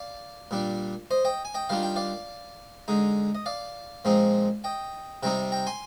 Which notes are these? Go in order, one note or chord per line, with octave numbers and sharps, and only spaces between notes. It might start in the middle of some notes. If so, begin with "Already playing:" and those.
Already playing: D5 F5
A#2 G3 D4
C5 D#5
D#5 G5
G#5
D#5 G5
D#3 G3 D4 F4 F5
G5
D5 F5
D3 G#3 D#4
D#5
D5 F5
A#2 F3 G#3 C4 D#4
D#5 G5
C3 G3 C4 D#4 G5 A#5
G5 A#5
G#5 C6